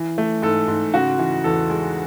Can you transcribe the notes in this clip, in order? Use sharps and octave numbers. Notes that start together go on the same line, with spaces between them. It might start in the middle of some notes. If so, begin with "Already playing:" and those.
Already playing: E3
A3
G#2 A4
G#2
C#3 F#4
E3
E2 A4
G#3